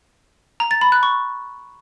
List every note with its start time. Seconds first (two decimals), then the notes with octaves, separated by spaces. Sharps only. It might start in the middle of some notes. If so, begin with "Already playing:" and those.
0.60 A#5
0.71 A6
0.81 B5
0.92 F#6
1.03 C#6